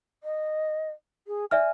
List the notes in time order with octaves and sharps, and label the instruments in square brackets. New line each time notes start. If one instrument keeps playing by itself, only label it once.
[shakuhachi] D#5
G#4
[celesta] D5 E5 F6 [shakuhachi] G#5